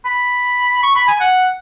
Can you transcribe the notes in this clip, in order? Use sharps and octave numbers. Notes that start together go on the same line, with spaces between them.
B5
C#6
B5
G#5
F#5